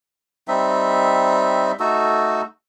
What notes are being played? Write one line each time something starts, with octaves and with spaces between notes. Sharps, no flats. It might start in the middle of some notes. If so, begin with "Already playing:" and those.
G3 C4 D#4 E5
A3 D#4 F#4 A4